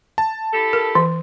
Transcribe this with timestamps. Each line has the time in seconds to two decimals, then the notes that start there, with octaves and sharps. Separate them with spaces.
0.18 A5
0.53 E4 G4 A4
0.73 A#4
0.95 E3